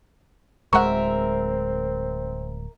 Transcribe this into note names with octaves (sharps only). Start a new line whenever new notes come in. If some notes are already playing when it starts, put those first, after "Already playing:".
D1 G#3 C4 A#4 E5 F#5 C#6